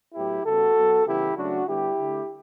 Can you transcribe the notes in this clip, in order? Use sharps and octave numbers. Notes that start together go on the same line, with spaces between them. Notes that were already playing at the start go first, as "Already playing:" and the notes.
A2 F#3 B3 E4 G4
C#3 G3 B3 F#4 A4
B2 F#3 B3
C#3 E3 G3 B3 E4 G4
C#3 F#3 A3 D4 F#4
D3 G3 B3 E4 G4
D3 A3